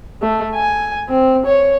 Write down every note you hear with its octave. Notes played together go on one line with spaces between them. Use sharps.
A3
G#5
C4
C#5